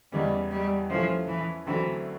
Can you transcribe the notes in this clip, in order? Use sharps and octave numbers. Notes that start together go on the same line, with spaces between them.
E2 C#3 E3 G3 G#3 C#4
G3
E3 F3 A3 C#4
E3
D2 D3 E3 F#3 A3 C4